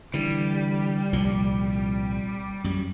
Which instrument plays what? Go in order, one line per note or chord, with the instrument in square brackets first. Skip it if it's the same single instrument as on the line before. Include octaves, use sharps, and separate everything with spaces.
[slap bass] D3 E3 [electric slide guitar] G3
[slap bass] C2 A#2 F3
F#2 G3